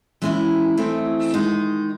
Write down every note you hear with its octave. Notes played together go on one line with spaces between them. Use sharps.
E3 G#3 C#4 E4
E3 A3 C4 D#4
D#3 G#3 D#4